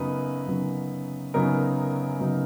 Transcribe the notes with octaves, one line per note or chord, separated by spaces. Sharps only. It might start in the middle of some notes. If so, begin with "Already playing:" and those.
Already playing: F#2 C#3 F#3 B3 D#4 B4
F#2 C#3 F#3 B3 D#4
F#2 C#3 F#3 B3 D#4 A#4
F#2 C#3 F#3 B3 D#4